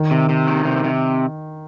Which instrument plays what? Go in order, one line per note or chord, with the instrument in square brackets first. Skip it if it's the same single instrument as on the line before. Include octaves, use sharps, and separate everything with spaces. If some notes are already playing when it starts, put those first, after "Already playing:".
Already playing: [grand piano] D#3
[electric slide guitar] C3
C3
D#3
C3
C3